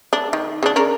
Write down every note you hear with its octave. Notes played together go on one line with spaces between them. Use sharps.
D4
D#3
C#3 D4
C#4 D4 A#4